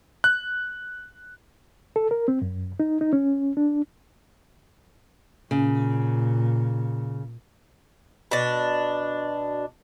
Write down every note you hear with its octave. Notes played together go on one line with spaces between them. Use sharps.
F#6
A4
A#4
C4
F#2
D#4
D#4
C#4
D4
A#2 C#3
B2 D4